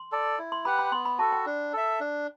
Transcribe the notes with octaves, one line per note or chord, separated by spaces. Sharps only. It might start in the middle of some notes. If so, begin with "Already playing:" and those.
Already playing: C6
A4 D5
E4
C6
G4 B4 F#5 B5
B5
B3 C6
B5
F#4 A4 A5
G5
D4
A4 E5
D4